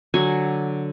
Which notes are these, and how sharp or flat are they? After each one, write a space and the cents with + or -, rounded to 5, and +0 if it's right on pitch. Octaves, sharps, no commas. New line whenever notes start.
D3 +0 F#3 +0 G#5 +0